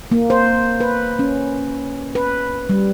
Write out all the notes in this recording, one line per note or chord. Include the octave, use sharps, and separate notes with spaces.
A#3
C5
B4
C#4
B4
G3